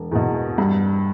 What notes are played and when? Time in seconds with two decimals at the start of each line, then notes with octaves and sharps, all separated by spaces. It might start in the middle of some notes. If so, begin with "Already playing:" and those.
Already playing: E1
0.11 E2 B2
0.58 G2